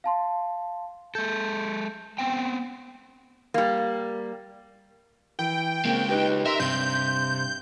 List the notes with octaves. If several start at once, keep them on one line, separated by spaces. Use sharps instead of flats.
F5 A5 C6
G#3 A4 G6
B3 C4 G5
G3 A#3
E3 G5
C#3 G#3 A#3 C4
D#4 G4 B4
A#4 E5 C6
G2 C3 C6 G6